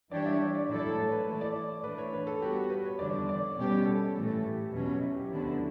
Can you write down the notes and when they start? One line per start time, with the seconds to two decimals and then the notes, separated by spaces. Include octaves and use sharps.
0.11 E3 G3 D4 G4 C#5 D5
0.26 E5
0.39 D5
0.55 D5
0.68 A2 F#3 A3 E4 A4 D5
0.97 C#5
1.12 B4
1.27 E3 A3 E4 A4
1.41 D5
1.84 A2 E3 A3 D4 B4
1.98 C#5
2.14 B4
2.27 A4
2.42 G3 B3 F#4 G4
2.70 B4
2.86 C#5
2.99 E2 D3 G3 D4 D5
3.29 D5
3.43 C#5
3.58 B2 G3 C#4 G4
3.85 A4
4.15 A2 E3 A3 A4
4.44 G4
4.72 E2 B2 F#3 C#4
5.02 E4
5.16 G4
5.30 D2 D3 F#3 B3 E4